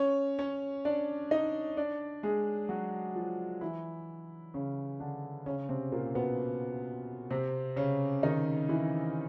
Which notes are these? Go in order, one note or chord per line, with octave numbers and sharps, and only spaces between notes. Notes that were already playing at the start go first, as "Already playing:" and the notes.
Already playing: C#4 C#5
C#4 C#5
D4 D5
D#4 D#5
D4 D5
G#3 G#4
F#3 F#4
F3 F4
E3 E4
C#3 C#4
D3 D4
C#3 C#4
C3 C4
A#2 A#3
B2 B3
C3 C4
C#3 C#4
D#3 D#4
E3 E4